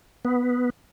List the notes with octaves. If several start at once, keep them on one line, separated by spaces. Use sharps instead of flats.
B3